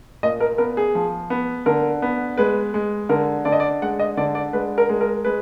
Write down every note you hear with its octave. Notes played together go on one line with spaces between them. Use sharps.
A#2 D#5
A#4
B3 A#4
G#4
F3
B3
D3 A#4
B3
G#3 B4
G#3
D3 A#4
D3 D5
D#5
D5
G#3 F#5
D#5
D3 D5
D5
G#3 B4
A#4
G#3
A#4
G#3 B4